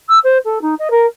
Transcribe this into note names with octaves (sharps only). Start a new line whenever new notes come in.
E6
C5
A4
D#4
D#5
A#4